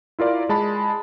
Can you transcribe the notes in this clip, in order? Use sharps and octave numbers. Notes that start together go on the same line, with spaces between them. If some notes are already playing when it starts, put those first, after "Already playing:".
E4 F4 A#4 D5 F5
G#3 A5 B5